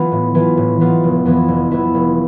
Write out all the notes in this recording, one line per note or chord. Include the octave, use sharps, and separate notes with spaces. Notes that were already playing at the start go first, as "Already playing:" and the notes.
Already playing: E3 B3 F4
A2
E3 B3 F4
A2
E3 B3 F4
F1
F2 E3 B3 E4
F1
F2 E3 B3 E4
F1